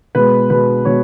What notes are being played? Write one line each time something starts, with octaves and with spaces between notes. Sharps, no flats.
B2 G#3 B3 B4
B2 G#3 B3 B4
B2 G#3 B3 C#5